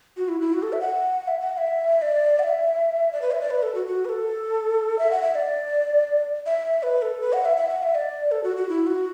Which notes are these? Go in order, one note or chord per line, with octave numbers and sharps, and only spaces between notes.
F#4
E4
E4
F#4
A4
E5
F#5
E5
F#5
F#5
E5
D5
F#5
E5
D5
B4
E5
D5
B4
A4
F#4
F#4
B4
A4
E5
F#5
E5
D5
E5
B4
A4
B4
F#5
E5
E5
F#5
E5
D5
A4
F#4
F#4
E4
F#4